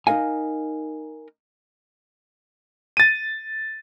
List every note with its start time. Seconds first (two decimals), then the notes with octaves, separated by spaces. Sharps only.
0.07 D#4 A#4 D#5 F5 G#5
2.97 A6 D#7